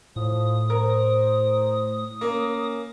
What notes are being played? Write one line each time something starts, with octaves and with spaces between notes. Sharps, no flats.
A2 F3 D#6
A#4 C5
A#3 C#4